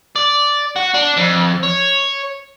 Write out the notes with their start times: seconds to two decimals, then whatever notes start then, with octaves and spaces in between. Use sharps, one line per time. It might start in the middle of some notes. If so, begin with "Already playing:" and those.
0.16 D5
0.76 F#4
0.94 D4
1.17 F2
1.63 C#5